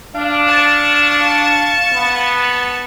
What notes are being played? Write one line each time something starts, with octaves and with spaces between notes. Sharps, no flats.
D4 F5
A5 C#6
B3